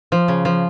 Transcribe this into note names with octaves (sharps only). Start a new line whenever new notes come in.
F3
C#3
F3